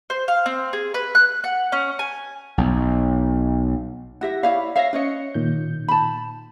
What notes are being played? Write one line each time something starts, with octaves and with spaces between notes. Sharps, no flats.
C5
F5
C4
G#4
B4
F#6
F#5
C#4
G#5
B1
E4 G4 E5 F#5 A#6
E4 C#5 D5 E5 F5 B5
C#5 E5 F5 A#6 C7
C#4 B4 C#5 D#5 C#7
A#2 D#3 G6
A5 B5